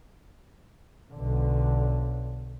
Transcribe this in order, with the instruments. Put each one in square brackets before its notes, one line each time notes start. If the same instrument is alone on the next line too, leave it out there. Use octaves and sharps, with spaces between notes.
[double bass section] B1 D3